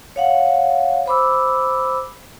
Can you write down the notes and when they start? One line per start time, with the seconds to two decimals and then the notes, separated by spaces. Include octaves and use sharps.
0.16 C#5 F5 F#5
1.06 C5 B5 D6 E6